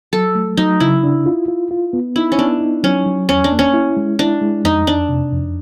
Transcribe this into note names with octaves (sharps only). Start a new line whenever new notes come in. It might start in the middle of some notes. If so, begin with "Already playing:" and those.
F#3 A4
A3
F#3 D#4
C#3 E4
D4
F4
F4
F4
B3
D#4 E4
C#4
B3 D4
D#4
F#3 C#4
F#3
E2 C#4
D4
A#3
C#4
E4
G#3
D4 E4
G#3
F2 D#4
F2 D4
C3
F2